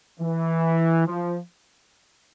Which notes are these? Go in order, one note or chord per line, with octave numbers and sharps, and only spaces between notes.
E3
F3